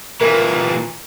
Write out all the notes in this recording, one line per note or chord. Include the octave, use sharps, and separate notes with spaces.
A#2 E3 A#4